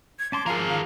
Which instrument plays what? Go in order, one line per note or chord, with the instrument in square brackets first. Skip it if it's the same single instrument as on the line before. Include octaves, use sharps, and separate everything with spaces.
[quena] G#6
[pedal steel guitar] C#4 A5 C6 [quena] D6
[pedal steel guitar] F3 F4 A#5 [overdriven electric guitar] G#4 A#4 [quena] F5
[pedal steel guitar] D#3